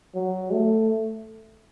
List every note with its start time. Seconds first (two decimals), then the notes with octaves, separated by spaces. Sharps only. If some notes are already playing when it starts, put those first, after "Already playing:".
0.15 F#3
0.51 A3